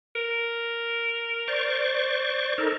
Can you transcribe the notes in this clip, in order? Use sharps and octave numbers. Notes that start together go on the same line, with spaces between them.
A#4
C5 D5 C#6
D#4 A4 A#4